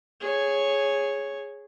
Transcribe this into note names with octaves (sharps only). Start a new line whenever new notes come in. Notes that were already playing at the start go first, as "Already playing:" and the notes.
G#4 C#5